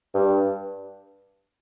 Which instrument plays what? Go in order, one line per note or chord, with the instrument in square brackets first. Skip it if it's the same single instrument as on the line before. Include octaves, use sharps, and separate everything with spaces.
[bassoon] G2